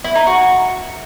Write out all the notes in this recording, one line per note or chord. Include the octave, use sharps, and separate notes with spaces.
E4
D#4
F#4